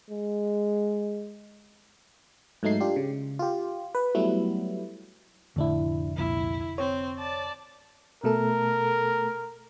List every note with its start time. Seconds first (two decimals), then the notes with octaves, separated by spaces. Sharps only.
0.10 G#3
2.63 G#2 F#3 A3 D#4 C7
2.80 D4 F4 G4
2.96 C#3
3.39 F4 G4
3.95 B4
4.15 F#3 G3 A3 B3 E4
5.56 F1 A2 D3 D4 E4
6.17 C2 F2 A#2 E4
6.78 C4 C#5
7.18 D5 A5
8.24 B2 A3 A4 A#4